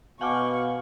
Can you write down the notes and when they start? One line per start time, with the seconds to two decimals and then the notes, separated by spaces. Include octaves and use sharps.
0.21 B2 F5 F#5 G#5 A5 C#6 D6 F6